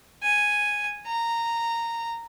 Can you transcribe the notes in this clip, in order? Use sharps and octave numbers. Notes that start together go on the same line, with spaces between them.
G#5
A#5